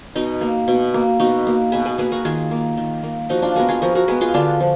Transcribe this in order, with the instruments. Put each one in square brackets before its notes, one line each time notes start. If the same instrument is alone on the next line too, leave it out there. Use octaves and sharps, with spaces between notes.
[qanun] B2 D#4
A#3
B2
A#3
B2 D#4 F#4
A#3
B2 G#4 B4
G#4 B4
A#3 G#4 B4
F#4 A#4
D#3 F4 G#4
A#3
D#3
A#3
F3 D#4 F#4
D4 F4
G#3 B3 F#4 A#4
F4 G#4
F3 F#4 A#4
F#4 A#4
G#3 B3 G#4 B4
F4 G#4
D3 D4 F4
F3